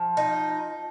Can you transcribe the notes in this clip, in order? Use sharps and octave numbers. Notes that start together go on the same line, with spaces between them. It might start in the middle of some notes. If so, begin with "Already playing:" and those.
Already playing: F3
D#4